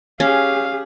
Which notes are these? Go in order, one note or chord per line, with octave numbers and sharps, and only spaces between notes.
C#4 G4 G#4 F5